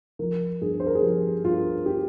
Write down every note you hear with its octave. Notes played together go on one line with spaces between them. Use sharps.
F3 A#4
G2 G#4
C5
A#4
G#4
F3 G4
G2 F4
G4